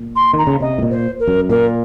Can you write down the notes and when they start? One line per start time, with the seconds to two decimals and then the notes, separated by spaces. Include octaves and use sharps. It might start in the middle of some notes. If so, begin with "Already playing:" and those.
Already playing: A#2
0.16 C6
0.33 D#3 A#5
0.47 C#3
0.60 C3 D#5
0.78 A2
0.82 A#2
0.90 C5
1.20 A#4
1.27 F#2
1.49 A#2 A#4